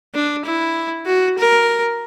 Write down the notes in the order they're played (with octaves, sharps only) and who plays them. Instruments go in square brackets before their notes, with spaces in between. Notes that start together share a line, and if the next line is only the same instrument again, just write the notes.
[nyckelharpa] D4
E4
F#4
A#4